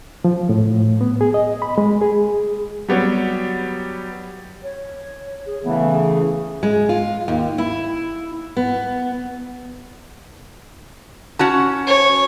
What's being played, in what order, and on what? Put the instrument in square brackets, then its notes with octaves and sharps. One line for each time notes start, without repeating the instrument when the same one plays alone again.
[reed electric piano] F3
A2
B3
G#4
D#5
B5
G#3
G#4
[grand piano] F#3 G3 B3 C#5
[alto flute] C#5
G#4
[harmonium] C#3 E3 A3 [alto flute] B3
[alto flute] G#4
[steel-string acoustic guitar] G#3
F4
D#2
E4
B3
[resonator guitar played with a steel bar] C#4 F#4 A5
[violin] C#5